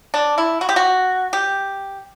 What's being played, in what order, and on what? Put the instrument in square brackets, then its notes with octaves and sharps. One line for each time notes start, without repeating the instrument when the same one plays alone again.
[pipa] D4
E4
F#4
G4
F#4
G4